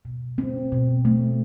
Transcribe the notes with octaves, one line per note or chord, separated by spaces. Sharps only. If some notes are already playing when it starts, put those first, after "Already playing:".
B2
C4
B2
A3